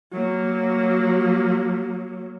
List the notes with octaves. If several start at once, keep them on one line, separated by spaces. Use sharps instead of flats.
F#3 A#3